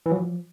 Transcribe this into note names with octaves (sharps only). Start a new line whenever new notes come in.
E3
F#3
F3